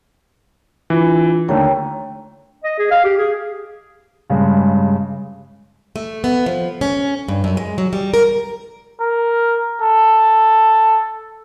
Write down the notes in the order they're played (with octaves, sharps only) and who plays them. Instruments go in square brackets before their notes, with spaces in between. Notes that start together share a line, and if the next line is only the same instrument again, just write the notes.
[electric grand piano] E3 [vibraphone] D4 F4
[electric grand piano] D#2 D3 A3 [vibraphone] C#5 G5 A#5
[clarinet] D#5
G#4
F5
G4
G#4
[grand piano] G2 C#3 G#3
[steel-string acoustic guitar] A3
B3
F3
C#4
G2
F#2
G#3
F#3
G3
A#4
[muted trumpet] A#4
A4